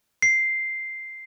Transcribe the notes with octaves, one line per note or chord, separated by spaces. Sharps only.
C7